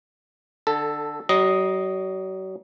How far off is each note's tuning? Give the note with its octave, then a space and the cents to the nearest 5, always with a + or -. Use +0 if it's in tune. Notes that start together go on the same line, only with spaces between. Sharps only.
D3 +20 A4 +0
F#3 +40 D#5 +0